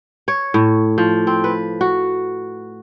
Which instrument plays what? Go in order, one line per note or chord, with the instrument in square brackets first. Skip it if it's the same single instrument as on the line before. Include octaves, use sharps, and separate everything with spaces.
[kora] C#5
A2
F3
C4
B4
F#4